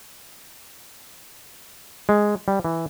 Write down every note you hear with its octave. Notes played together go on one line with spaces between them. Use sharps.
G#3
G3
E3